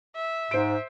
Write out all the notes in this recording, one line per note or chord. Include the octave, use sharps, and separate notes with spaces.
E5
G#2 C5 D7